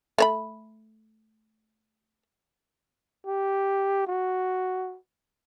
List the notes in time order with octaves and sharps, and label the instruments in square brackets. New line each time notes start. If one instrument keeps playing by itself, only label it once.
[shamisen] A3 C#5 B5
[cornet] G4
F#4